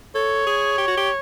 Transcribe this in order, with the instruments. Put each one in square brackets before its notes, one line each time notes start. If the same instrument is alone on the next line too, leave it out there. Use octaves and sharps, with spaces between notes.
[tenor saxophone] A4 [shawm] C#5
[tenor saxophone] G#4
G4
F#4
G4